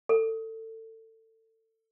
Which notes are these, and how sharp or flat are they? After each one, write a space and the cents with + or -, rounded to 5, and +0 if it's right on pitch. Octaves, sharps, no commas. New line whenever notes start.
A4 +25